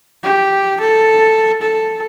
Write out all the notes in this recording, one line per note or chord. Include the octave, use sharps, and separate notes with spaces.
G4
A4
A4